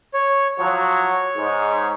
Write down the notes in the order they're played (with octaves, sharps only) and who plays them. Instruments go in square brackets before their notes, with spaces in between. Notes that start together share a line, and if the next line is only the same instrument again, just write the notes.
[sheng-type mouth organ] C#5
[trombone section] F3 F#3 [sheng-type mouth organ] C#5
[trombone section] G#2